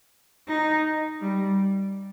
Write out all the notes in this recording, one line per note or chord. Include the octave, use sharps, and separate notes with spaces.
D#4
G3